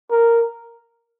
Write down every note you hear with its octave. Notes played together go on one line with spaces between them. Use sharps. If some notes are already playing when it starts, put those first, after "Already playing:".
A#4